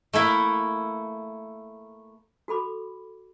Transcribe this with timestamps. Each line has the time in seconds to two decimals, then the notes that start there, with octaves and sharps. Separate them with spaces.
0.13 A3 A#3 E4
2.48 F#4 A4 B5 D6